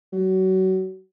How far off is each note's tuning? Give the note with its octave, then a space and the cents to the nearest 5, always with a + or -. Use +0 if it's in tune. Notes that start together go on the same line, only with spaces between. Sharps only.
F#3 +25